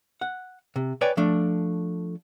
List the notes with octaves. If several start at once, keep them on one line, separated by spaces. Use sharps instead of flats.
F#5
C3
B4 C#5 D5 G5 G#5
F3 A3 D4